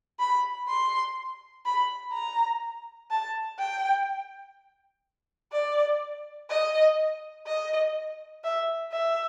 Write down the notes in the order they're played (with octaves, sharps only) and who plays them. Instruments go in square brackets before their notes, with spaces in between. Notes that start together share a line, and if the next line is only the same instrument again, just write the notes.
[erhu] B5
C6
B5
A#5
A5
G5
D5
D#5
D#5
E5
E5